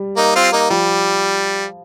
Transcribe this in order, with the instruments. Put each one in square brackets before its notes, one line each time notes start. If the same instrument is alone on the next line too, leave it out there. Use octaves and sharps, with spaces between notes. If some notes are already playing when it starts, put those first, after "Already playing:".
Already playing: [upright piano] G3
[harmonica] A#3 D#4
C4 F4
A#3 D#4
[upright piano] F3 [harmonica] G3